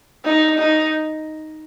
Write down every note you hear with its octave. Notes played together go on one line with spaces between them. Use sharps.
D#4
D#4